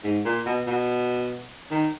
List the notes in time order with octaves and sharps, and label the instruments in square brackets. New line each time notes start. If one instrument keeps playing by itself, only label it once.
[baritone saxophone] G#2
A#2
B2
B2
D#3